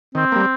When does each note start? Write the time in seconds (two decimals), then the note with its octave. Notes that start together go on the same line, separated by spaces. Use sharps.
0.15 D#3 C4
0.32 G3 A#3